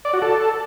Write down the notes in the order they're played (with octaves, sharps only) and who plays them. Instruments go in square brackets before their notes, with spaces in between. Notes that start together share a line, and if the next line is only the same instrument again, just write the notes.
[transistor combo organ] D5
F#4
A4